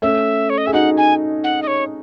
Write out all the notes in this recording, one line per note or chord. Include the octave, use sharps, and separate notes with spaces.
A3 C#4 E5
C#5
D#5
G#4 E5
D#4 F#4 F#5
G#5
F#5
D#5
C#5